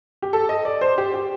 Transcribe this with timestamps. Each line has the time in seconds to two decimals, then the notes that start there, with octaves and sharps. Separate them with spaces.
0.22 G4
0.33 A4
0.49 D#5
0.65 D5
0.81 C5
0.98 G4
1.14 G4